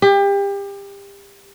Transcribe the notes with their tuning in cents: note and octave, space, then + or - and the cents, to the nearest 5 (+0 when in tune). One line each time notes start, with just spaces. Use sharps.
G4 +30